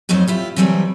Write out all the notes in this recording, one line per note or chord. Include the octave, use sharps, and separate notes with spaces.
F2 F#3 A3 D#4 C5
E4 F4 G4
C3 E3 F#3 G3 A3 B4